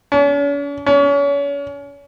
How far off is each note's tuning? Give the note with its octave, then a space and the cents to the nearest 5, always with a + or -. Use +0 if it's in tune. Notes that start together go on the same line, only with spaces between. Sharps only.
C#4 +45
C#4 +35